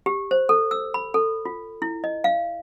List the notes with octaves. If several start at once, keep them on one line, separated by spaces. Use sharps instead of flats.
G4
C5
A4
E6
B5
A4
F4
E4
D#5
F5